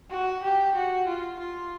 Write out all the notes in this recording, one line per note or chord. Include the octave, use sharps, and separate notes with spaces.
F#4
G4
F#4
F4
F4